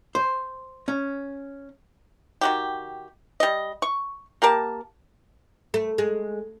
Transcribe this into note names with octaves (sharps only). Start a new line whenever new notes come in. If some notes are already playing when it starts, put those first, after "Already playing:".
C5
C#4
D#3 F#4 G4
G3 D#5
C#6
A#3 G4 A#4 A5
A3
G#3